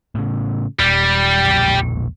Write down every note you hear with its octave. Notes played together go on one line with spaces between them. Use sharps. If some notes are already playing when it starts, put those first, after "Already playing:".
A2 C#3
D#1 G3
E1 A#1